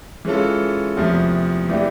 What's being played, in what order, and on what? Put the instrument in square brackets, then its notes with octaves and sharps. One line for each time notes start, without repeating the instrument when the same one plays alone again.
[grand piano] E3 G#3 C#4 F4 A4
E2 C3 F3 A3
E3 A3 D4 G4